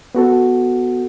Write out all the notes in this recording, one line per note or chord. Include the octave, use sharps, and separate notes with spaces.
B3 F#4 A4